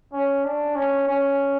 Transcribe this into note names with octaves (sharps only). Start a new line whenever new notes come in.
C#4
D4
C#4
C#4